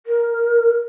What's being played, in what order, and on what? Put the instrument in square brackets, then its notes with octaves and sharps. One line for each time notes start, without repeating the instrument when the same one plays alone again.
[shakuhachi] A#4